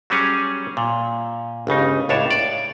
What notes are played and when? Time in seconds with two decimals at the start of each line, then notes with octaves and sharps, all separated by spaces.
0.10 F#3 G3 C#4 G#4 C#5
0.77 A#2
1.67 G1 C#2 C#3 D#4
2.09 C#2 A2 D4 C#5 A5
2.31 D5